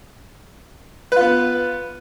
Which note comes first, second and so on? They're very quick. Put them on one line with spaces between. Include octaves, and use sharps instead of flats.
B4 F4 B3